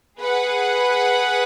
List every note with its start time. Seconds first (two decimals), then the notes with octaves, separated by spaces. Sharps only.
0.20 G#4 B4 F#5